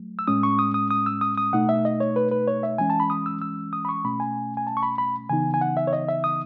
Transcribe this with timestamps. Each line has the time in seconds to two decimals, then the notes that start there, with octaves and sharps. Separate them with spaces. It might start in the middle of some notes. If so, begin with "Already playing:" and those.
Already playing: F#3 A3
0.19 E6
0.27 A2 G#3 C#4 D#6
0.43 C#6
0.59 D#6
0.74 D#6
0.91 D#6
1.06 E6
1.21 D#6
1.38 D#6
1.53 B2 A3 D#4 F#5
1.69 E5
1.85 D#5
2.00 C#5
2.16 B4
2.32 B4
2.48 C#5
2.63 E5
2.78 E3 G#3 C#4 G#5
2.90 A5
3.00 B5
3.10 D#6
3.26 E6
3.42 E6
3.73 D#6
3.85 B5
3.89 C#6
4.04 B2 A3 C#4 B5
4.20 G#5
4.57 G#5
4.67 A5
4.77 C#6
4.83 B5
4.98 B5
5.29 C#3 E3 B3 D#4 G#5
5.54 G#5
5.61 F#5
5.77 E5
5.87 C#5
5.93 D#5
6.08 E5
6.24 D#6